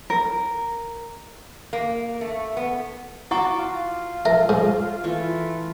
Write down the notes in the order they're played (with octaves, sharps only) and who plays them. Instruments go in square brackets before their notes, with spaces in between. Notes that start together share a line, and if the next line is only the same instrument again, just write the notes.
[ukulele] A#4
[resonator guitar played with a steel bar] A#3
A3
B3
[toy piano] E4 F#5 C#6 [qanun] F#4 A5 D6
[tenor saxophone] F4
[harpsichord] A#4 [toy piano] E5
[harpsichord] G#2
[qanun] E3 F4 [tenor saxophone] A3